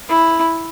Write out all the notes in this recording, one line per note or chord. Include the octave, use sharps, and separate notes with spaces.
E4